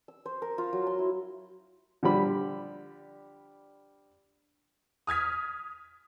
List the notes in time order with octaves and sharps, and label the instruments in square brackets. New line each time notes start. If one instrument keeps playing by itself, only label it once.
[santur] E6
C5
A#4
F4
F#3
C6
E4
[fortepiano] D3 F3 G3 B5
[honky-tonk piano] D#6 F6 G#6 B6